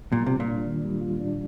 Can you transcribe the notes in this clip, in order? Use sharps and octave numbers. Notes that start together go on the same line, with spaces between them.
A#2 G3
C3 F4
A#2
D4
D#3
G3
F4
D4